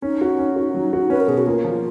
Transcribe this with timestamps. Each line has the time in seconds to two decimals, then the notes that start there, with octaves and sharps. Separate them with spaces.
0.02 C#4 D#4
0.21 F#4
0.39 C#4
0.56 F#4
0.74 F#3
0.93 F#4
1.10 C#4 B4
1.20 A#4
1.28 B2 G#4
1.37 F#4
1.46 A#3 F4
1.64 F3